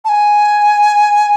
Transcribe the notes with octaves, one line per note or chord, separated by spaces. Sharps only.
A5
G#5